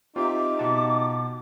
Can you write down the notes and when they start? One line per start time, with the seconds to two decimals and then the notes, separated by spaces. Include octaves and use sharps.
0.16 C4 D#4 F4 G4 E5 D6
0.59 B2 F#5 A5